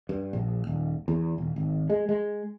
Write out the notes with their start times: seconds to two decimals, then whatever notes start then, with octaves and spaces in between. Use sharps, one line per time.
0.09 G2
0.33 A#1
0.67 D#1
1.08 E2
1.38 D#1
1.56 G#1
1.90 G#3
2.09 G#3